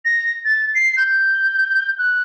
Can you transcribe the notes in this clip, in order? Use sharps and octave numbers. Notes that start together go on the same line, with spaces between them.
A#6
A6
C7
G6
F#6